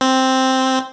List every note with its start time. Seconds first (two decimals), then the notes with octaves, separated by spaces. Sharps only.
0.01 C4